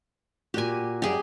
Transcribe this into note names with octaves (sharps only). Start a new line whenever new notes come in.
A#2 F#4 G4 G#5
F#2 G3 G4 G#4